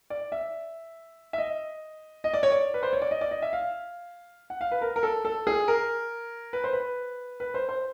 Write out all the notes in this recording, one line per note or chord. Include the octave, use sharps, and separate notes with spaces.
D5
E5
E5
D#5
D#5
D5
C#5
D5
B4
C5
C#5
D5
D#5
D5
D#5
E5
F5
F#5
F5
B4
A#4
A#4
A4
A4
G#4
A#4
B4
C5
B4
B4
C5
C5